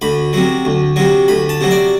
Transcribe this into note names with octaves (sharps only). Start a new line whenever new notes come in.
D2 B5
C3 F#3
D2
C3 F#3
D2 B5
A5
C3 F#3
D5